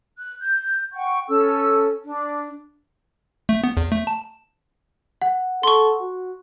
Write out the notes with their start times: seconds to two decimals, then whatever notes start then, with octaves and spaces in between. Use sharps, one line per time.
0.18 F#6
0.40 G6
0.93 F#5 G5 C#6
1.28 C#4 A4 E6
2.04 D4
3.49 A3
3.64 B3
3.77 E2
3.92 A3
4.07 A5
5.22 F#5
5.63 A4 C6 C#6
6.00 F#4